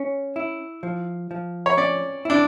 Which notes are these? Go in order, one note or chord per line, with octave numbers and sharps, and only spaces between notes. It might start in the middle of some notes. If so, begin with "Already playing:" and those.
Already playing: C#4
E4
F3
F3
C#5
C#4 D5
D4 E4